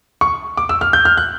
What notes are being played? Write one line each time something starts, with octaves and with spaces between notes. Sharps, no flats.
C#6
D6
E6
F6
G6
F6
F#6